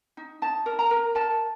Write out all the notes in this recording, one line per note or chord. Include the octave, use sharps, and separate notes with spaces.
D#4
D#4 A5
A#4
A#5
A#4
A#4 A5